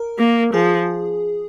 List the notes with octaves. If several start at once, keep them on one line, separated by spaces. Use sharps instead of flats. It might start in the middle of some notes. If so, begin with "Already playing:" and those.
Already playing: A#4
A#3
F3 G#4